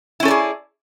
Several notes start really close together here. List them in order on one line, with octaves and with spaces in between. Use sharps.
E4 C#4 A4 D5 G#4